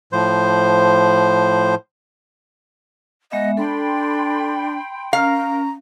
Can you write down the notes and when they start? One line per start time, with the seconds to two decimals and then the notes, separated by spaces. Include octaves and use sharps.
0.12 A2 F3 C5
3.32 G#3 B3 D#5 E5 F#5
3.57 D4 A4 G5 B5 C6
5.13 C#4 A#4 F5 A#5